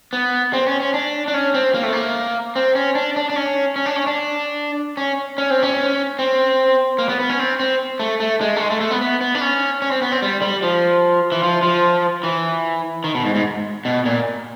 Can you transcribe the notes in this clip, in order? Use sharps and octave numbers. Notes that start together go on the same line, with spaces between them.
B3
C4
C#4
C#4
D4
D4
C#4
C4
A#3
A3
A#3
C4
C#4
D4
D4
D4
C#4
C#4
D4
C#4
D4
C#4
C#4
C4
C#4
C4
A#3
B3
B3
C#4
C4
C4
A3
A3
G#3
A3
G#3
A3
A3
B3
B3
B3
D4
C#4
C#4
C4
B3
C4
G3
G3
F3
E3
F3
F3
E3
D#3
B2
G#2
G#2
B2
A#2